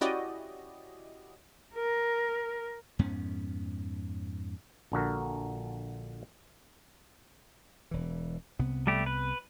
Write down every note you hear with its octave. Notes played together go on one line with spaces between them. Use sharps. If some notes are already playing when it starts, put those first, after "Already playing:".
C#4 E4 F#4 G4 D5 D#5
A#4
F2 G#2 B3 C#4
A#1 D3 F#4 A#4
E1 E3
C2 C3 B3
G3 A3 G4
B4